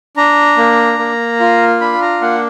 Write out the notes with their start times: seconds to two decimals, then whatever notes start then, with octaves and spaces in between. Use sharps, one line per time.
0.17 D4 A#5
0.58 A#3
0.99 A#3
1.40 F4
1.81 D4 B5
2.02 A#5
2.21 A#3 F#5